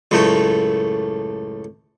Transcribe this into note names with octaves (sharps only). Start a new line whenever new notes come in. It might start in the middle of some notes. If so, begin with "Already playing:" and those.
C#2 F#2 A2 A3